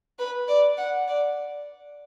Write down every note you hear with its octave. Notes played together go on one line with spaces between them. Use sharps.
B4
D5
F#5
D5